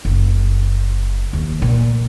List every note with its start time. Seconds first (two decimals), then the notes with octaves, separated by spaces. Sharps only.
0.05 F#1
1.33 D#2
1.62 A#2